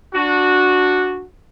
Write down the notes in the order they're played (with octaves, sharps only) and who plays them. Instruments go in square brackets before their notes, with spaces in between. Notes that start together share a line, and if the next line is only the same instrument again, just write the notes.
[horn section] D4 F#4